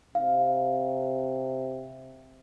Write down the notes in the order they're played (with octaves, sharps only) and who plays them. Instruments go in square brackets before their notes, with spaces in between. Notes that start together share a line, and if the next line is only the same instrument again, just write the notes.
[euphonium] C3 [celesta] F5